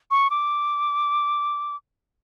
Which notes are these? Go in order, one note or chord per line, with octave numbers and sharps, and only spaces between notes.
C#6
D6